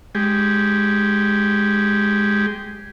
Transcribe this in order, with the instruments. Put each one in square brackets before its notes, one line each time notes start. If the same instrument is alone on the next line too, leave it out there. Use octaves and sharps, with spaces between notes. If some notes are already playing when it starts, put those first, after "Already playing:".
[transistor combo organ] G#3 G4